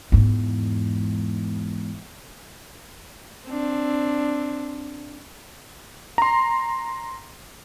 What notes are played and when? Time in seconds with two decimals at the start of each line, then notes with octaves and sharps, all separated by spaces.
0.12 E2 G#2
3.48 C4 D4
6.18 A#5 C6